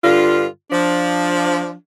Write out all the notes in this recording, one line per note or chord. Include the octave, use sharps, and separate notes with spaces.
G2 D3 F4
F3 D4